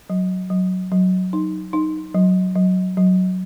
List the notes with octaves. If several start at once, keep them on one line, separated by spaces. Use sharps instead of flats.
F#3
F#3
F#3
D#4
D#4
F#3
F#3
F#3